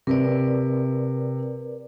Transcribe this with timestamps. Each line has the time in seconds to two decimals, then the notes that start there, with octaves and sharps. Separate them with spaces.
0.07 C3 A#4 B4 D5